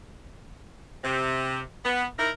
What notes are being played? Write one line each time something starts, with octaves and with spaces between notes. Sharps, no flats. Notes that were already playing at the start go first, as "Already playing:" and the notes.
C3
B3
D#4 E4 A#4